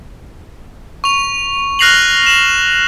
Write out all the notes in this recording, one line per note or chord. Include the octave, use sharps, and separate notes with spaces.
C#6 F7
F6 F#6 A#6 C7 F7 F#7
E7 F#7